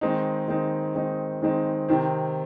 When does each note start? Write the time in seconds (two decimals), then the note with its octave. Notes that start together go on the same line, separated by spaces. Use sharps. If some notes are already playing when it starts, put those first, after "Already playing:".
0.01 D#3 G#3 C4 D#4
0.48 D#3 G#3 C4 D#4
0.95 D#3 G#3 C4 D#4
1.42 D#3 G#3 C4 D#4
1.88 C3 D#3 C4